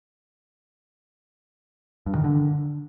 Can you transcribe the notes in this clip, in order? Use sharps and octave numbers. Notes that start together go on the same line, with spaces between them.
G2
D#3
D3